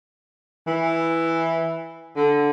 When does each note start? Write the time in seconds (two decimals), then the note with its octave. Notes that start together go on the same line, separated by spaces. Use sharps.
0.67 E3
2.16 D3